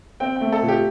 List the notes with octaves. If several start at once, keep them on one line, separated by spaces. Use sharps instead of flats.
C4 G5
G5
A3
A4
A#2
G4